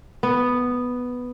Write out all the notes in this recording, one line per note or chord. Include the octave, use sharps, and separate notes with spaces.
B3